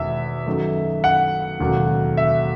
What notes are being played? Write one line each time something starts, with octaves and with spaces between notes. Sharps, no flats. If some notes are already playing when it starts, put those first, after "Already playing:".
Already playing: E1 E2 D#3 G#3 E5
F#2 D#3 F#3 A3
F#5
E1 D#2 C#3 F#3 A3
E5